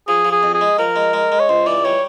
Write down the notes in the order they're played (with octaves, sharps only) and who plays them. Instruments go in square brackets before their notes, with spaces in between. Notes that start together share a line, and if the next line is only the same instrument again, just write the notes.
[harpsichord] F3 [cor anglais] G#4
[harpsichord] F3
[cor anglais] G#4
[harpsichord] F2
[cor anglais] G#4
[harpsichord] G#3
[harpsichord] F3 [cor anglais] A#4
[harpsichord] G#3
G#3
G#3
[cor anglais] C#5
[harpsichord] C#2 [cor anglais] C5
[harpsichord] E3 [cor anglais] D5
[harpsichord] G3 [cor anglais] C#5